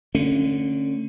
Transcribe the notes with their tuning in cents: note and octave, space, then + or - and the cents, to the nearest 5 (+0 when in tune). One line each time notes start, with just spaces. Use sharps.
D3 +0 A3 +35 C#4 -15